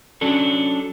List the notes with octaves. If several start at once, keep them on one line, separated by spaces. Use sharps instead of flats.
F#3 C#4 D4 A4